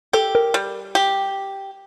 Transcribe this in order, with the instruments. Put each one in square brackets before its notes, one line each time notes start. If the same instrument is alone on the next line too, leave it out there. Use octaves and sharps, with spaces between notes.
[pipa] G4 [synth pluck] A4
[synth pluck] A#4
[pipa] G3
G4